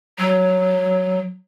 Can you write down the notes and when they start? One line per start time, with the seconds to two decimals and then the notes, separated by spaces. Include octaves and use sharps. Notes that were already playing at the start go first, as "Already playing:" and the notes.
0.19 F#3